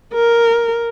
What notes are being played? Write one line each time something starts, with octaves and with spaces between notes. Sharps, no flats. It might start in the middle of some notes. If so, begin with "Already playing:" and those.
A#4